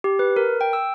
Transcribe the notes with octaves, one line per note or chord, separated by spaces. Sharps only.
G4
B4
A#4
G5
E6